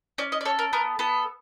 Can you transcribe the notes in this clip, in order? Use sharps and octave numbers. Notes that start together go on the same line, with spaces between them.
C#4 D5
D#5
D5
A4 C#5
A#4
B3 A#4
B3 A4